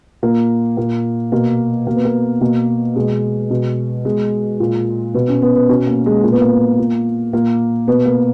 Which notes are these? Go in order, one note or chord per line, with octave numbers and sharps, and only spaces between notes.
A#2 A#3
A#2 A#3
B2 A#3
B2 A#3
B3
A#3
B2 A#3
B2 G#3
B2
B2 G#3
A#2
B2 B3
C#4
B3
B3
B2 C#4
A#3
G#3
A#2 A#3
B3
A#3
A#2
A#2 A#3
B2 B3
A#3